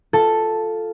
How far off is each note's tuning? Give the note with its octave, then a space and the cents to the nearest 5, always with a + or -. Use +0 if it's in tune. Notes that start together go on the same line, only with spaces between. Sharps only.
F4 +0 A4 +0